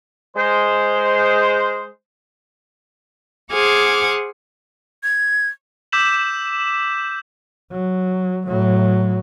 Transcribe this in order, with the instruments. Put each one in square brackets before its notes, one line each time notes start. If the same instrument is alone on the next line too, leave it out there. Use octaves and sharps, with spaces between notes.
[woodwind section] G#3 C5
[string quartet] G#4 C5 F#5 D6 F6 G#6
[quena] G#6
[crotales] D6 E6 G6 B6 E7 F#7
[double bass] F#3
A2 F#3